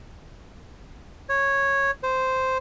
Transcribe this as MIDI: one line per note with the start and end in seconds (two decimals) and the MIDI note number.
1.29 1.91 73
2.03 2.58 72